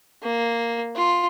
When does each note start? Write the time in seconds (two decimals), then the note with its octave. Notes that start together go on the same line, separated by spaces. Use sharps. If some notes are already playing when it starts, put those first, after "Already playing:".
0.23 A#3
0.96 F4